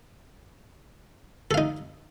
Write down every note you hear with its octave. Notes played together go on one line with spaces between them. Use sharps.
D#4 A4 F5